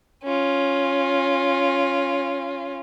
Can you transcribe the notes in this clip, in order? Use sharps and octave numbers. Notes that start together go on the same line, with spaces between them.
C#4 F4